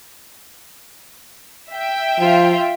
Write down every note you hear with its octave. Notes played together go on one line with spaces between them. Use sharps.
E5 G5
F3 F4